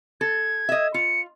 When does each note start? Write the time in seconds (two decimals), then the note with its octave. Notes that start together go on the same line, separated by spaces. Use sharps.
0.21 A4 G#6
0.69 D#5 E5
0.94 F4 C#7